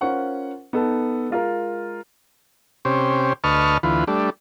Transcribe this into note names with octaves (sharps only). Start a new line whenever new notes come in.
C#4 F4 A#4 C5 F#5 C#6
B3 D#4 A4
G#3 F4 A#4
C3 C#4 G4 C5
D2 B4 D#5 A5 C#6 F6
D2 E3 F4 B4
G3 A3 D4